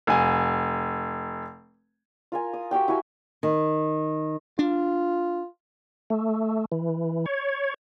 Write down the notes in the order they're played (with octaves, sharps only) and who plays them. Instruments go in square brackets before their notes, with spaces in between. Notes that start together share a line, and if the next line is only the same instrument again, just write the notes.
[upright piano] F1 G#5
[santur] F4 A#4 G#5
D#6
F#4 G4 F5 G5
E4 F#4 G4 G#5
[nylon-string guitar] D#3
[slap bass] D4 [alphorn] F4
[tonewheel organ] A3
E3
C#5